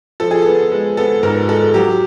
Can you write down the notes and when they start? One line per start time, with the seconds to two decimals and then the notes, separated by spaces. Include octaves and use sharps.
0.20 F3 A4
0.31 G#4
0.42 B3 A4
0.72 G#3
0.97 B3 A4
1.23 G#2 A#4
1.49 G#3 A4
1.74 F#3 G4